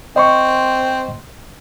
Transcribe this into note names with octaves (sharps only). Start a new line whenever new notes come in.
C4 D#5 C6 C#6